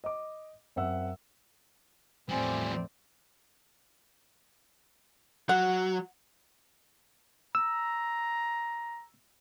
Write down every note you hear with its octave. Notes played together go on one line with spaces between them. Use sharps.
D#5 D6
F#2 C4 E5 F#5 E6
E2 A2 F3 G3 C4 D5 G#5
F#3 F#5
A#5 E6